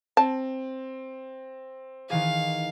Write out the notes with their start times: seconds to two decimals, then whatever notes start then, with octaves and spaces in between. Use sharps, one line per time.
0.17 C4 A5
2.10 D#3 E3 G#4 F5